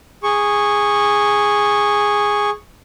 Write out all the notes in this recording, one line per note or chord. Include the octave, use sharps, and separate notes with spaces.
G#4 C#6